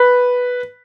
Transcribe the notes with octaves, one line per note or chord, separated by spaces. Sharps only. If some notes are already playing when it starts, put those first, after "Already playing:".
Already playing: B4